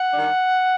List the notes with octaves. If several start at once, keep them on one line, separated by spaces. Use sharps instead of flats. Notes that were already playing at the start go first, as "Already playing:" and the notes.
Already playing: F#5
D#3 G3 D4